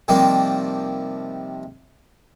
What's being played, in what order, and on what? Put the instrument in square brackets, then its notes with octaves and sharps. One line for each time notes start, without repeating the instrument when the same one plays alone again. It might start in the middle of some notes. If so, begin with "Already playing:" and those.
[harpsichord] C3 D#3 F3 G3 A#3